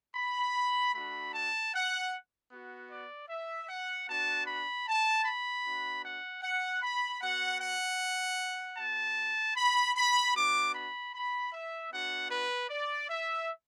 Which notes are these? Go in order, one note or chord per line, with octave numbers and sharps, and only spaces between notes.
B5
A3 D4 F#4 B5
A5
F#5
B3 F#4
D5
E5
F#5
B3 D4 F#4 A5
B5
A5
B5
B3 D4 F#4
F#5
F#5
B5
B3 F#4 F#5
F#5
B3 F#4 A5
B5
B5
B3 D4 F#4 D6
B5
B5
E5
B3 D4 F#4 F#5
B4
D5
E5